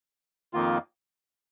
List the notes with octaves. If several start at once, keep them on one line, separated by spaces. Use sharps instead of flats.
F2 D#3 A#3 F4